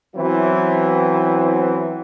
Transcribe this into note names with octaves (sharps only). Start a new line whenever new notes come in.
E3 F#3 B3 C4 E4